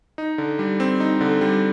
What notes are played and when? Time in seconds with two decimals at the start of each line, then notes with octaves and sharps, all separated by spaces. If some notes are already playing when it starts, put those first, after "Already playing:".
0.18 D#4
0.38 D3
0.59 G3
0.80 C4
1.00 D#4
1.21 D3
1.41 G3